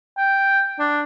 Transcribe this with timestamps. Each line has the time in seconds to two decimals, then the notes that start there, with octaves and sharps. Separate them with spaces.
0.18 G5
0.79 D4